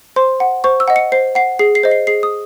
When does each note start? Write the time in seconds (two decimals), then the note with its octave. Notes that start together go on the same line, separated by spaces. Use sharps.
0.16 C5 C6
0.40 F#5
0.64 C5 C#6
0.80 E6
0.88 D#5 F#5
0.96 C#7
1.12 C5 C7
1.35 F#5 C7
1.59 G#4 C7
1.75 C7
1.83 C5 D#5
1.91 C7
2.07 G#4 C7
2.23 D#6